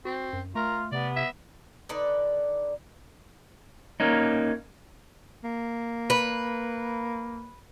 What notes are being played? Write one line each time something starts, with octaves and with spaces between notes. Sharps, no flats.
C4 F#4
F#2
A3 F4 A#4
C3 B3 D5
E5
D3 D#4 B4 D5
A#3 C#4 D#4
A#3
B4